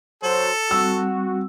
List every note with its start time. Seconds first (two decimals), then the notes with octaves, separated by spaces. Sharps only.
0.23 F#3 A4 C5
0.71 G3 C4 F#4 E6